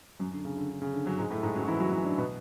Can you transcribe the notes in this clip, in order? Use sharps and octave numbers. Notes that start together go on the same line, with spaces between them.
F#2 F#3
D3
C#3
D3
D3
C#3
D3
F#2 F#3
G#2 G#3
A2 A3
G#2 G#3
F#2 F#3
F#4
E3 E4
F#3 F#4
E3 E4
D3 D4
B2 B3